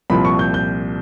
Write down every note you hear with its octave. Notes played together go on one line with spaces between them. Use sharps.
C2 A#2 F3 B5
C#6
G6
G6